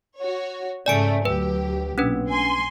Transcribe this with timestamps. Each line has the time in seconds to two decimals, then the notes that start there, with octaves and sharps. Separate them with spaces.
0.18 F#4 C#5
0.86 G#2 C#3 A3 D5 G#5 D7
1.25 D2 F#3 G4 B4
1.98 B1 A#2 C#4 D4 B4
2.29 G#5 C6